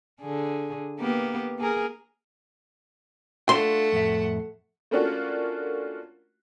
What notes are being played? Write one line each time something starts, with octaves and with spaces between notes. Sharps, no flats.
D3 G#4
A#3 B3 G4
A#3 G#4 A#4
A3 D4 F4 F#5 C6
F2 A2 E5
A3 A#3 C#4 D4 F4 F#4